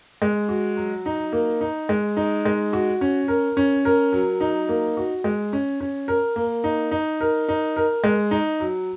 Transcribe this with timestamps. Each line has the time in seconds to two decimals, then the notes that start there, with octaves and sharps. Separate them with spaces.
0.22 G#3
0.49 F#4
0.77 F#3
1.06 D#4
1.32 A#3
1.61 D#4
1.89 G#3
2.17 D#4
2.45 G#3
2.73 F#4
3.01 C#4
3.28 A#4
3.57 C#4
3.85 A#4
4.12 F#3
4.41 D#4
4.69 A#3
4.97 F#4
5.24 G#3
5.53 C#4
5.80 C#4
6.08 A#4
6.36 A#3
6.64 D#4
6.91 D#4
7.21 A#4
7.49 D#4
7.76 A#4
8.04 G#3
8.31 D#4
8.60 F#3